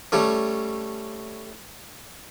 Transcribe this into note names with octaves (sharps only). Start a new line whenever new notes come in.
G3 A3 C#4